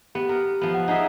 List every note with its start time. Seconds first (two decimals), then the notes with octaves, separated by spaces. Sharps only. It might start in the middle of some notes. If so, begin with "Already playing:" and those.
0.15 B3 G4
0.29 A#4
0.61 F3 B3
0.74 F#5
0.88 D#4 G#4 E5